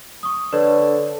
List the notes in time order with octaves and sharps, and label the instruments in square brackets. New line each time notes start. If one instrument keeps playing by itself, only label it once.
[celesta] C#6 D#6
[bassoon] D3 [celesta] B4 C#5 D5